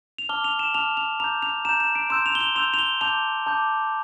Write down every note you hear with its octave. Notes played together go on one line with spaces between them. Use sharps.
F7
A5 D6 F6 G7
F7
E7
A5 D6 F6 F7
F7
A#5 D6 G6 F7
F7
A#5 D6 G6 E7
E7
D7
C6 E6 G6 E7
F7
G7
F7
C6 E6 G6 F7
F7
G7
A5 D6 G6 F7
A5 D6 G6